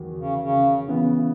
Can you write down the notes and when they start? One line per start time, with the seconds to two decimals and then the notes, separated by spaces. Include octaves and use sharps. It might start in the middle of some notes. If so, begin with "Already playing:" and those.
Already playing: E2 D#3 F#3
0.18 C#3
0.41 C#3
0.88 C#3 E3 B3